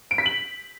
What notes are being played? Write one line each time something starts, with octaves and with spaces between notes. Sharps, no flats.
D7
B6
F#7